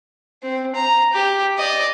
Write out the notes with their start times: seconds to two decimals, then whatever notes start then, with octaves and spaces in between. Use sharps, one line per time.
0.43 C4
0.75 A#5
1.13 G4
1.58 D5 D#5